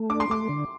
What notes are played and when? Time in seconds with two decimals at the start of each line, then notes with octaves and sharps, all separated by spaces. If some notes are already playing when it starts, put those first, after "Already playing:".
Already playing: A3
0.10 D4 D6
0.20 C6
0.30 A3 D6
0.49 D3